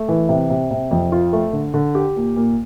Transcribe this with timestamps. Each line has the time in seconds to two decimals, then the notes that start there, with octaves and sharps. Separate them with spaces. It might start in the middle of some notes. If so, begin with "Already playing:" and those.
Already playing: A3
0.09 E3
0.29 C3
0.50 C3
0.71 C3
0.91 F2
1.12 F4
1.33 A3
1.53 D3
1.74 D3
1.95 G4
2.16 A#2
2.36 A#2